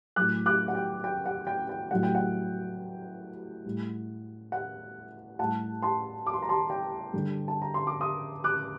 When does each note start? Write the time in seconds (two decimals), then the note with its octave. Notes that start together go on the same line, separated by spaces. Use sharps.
0.16 A2 F#3 D6 F#6
0.46 D6 F#6
0.68 F#5
0.75 G5
1.04 G5
1.26 F#5
1.47 G5
1.69 G5
1.91 A2 F#3 F#5
2.03 G5
2.15 F#5
3.65 A2 G3
4.52 F#5
5.39 A2 G3 F#5 A5
5.82 A5 C6
6.27 D6
6.34 C6
6.42 A#5
6.49 A5 C6
6.70 G5
7.13 G2 D3 G3
7.48 A5
7.62 A#5
7.74 C6
7.87 D6
8.00 C6 D#6
8.44 D6 F#6